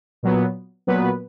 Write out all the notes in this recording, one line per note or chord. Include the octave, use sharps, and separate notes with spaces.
A#2 F#3 B3
A#2 F#3 B3 B4